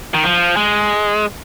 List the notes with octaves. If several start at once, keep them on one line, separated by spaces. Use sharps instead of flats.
D#3
F3
G#3